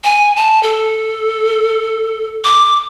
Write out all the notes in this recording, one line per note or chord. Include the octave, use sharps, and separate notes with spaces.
G#5
A5
A4
D6